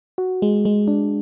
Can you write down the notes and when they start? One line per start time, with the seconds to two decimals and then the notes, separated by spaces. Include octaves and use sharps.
0.18 F#4
0.42 G#3
0.65 G#3
0.88 D4